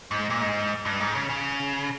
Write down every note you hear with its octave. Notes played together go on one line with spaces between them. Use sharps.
G#2
A#2
G#2
G2
G#2
C#3
C#3